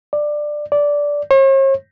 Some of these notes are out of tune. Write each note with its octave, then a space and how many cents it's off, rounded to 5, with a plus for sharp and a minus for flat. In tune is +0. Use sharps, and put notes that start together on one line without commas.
D5 +15
D5 -10
C#5 -45